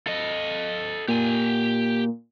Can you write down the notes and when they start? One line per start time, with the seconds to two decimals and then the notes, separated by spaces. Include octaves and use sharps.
0.07 A4 D#5
1.08 A#2 G4 G#5